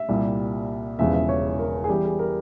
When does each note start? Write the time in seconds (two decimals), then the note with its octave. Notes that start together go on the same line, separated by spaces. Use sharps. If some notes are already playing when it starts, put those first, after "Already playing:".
Already playing: E5
0.09 C2 A#2 G3
0.99 E1 E2 C#3 F3 E5
1.14 E5
1.29 C#5
1.59 A#4
1.84 G#4
1.89 E2 E3 G3 G4
2.05 G#4
2.19 A#4